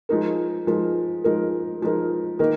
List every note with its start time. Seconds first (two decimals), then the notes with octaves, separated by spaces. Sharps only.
0.09 F3 G#3 D#4 A#4
0.67 F3 G#3 D#4 A#4
1.24 F3 G#3 D#4 A#4
1.82 F3 G#3 D#4 A#4
2.39 D#3 A#3 D#4 A#4